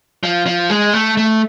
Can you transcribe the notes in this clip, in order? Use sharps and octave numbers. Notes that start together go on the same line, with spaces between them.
F3
F3
G#3
A3
A3